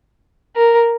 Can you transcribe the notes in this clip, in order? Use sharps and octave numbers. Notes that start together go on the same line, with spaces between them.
A#4